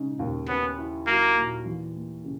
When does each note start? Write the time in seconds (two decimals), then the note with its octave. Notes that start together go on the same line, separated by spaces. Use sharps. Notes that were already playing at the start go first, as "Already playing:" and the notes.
Already playing: C#3 G#3 D#4
0.19 D#2
0.48 B3 C#4
0.78 E4
1.07 F#3 A#3
1.36 A#2
1.66 E3
1.95 A#3
2.24 C#3